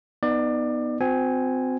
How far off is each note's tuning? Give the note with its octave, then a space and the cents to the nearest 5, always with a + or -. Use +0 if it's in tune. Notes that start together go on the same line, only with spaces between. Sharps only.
B3 -5 D#4 +0 D5 +25
C4 -25 F#4 -45 G#5 +0